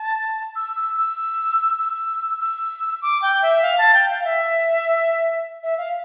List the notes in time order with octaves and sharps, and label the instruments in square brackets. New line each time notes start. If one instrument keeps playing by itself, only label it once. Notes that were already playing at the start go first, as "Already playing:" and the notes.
Already playing: [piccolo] A5
E6
E6
E6
E6
E6
D6
G5
E5
F5
A5
G5
F5
E5
E5
F5